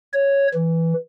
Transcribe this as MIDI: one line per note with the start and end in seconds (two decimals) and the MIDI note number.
0.13 0.47 73
0.54 0.93 52